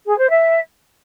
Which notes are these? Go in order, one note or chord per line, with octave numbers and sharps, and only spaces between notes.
G#4
C5
E5